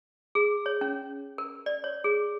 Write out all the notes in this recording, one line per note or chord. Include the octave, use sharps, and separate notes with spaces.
G#4
C#5
C#4
A#4
D5
C#5
G#4